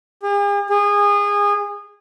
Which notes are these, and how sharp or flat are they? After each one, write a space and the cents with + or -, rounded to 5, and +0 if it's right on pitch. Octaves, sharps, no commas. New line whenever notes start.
G#4 -45
G#4 -25